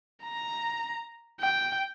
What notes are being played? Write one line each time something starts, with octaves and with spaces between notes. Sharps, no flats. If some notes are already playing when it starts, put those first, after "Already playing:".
A#5
G5